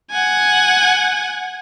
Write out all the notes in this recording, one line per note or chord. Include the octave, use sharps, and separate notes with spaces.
F#5 G#5